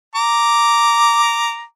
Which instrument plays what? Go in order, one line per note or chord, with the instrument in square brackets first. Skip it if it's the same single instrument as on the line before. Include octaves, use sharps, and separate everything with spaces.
[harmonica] A#5 D6